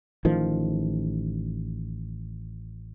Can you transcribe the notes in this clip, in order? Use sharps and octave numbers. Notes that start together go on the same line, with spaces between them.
A1 D#3 F3